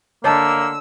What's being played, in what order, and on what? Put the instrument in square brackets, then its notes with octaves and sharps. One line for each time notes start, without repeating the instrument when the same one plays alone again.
[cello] D3 [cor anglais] A#3 [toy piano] C#5 D#5 A5 [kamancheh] E6